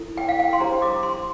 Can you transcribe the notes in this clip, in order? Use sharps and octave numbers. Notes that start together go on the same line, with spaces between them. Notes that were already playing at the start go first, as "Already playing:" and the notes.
Already playing: E4 A4
G5
F5
G5
C6
D4 G4 C5 A#5
D6
C6